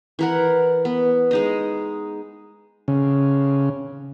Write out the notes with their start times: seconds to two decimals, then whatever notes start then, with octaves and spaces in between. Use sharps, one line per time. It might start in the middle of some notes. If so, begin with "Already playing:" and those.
0.19 E3 A#4 F#5
0.85 B3
1.31 G#3 D#4 D#5
2.88 C#3